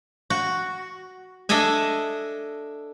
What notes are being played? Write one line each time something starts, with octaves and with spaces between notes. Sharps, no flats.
F#4
D4 A4 D#5 E5 G#5